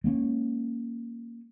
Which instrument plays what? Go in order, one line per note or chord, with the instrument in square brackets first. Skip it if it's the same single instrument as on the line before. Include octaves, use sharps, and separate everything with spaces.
[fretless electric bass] G#3 A#3 C4 C#4